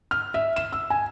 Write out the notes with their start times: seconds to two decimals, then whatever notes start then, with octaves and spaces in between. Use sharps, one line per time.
0.11 F6
0.34 E5
0.56 E7
0.72 E6
0.90 G#5